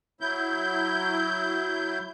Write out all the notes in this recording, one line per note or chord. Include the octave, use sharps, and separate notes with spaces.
F#3 E4 G6